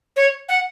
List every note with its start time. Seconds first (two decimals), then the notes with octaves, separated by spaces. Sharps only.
0.16 C#5
0.49 F#5